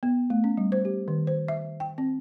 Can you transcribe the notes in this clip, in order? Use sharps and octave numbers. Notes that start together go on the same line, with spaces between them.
B3
A3
C#4
G3
C5
G4
D#3
C5
E5
G5
C4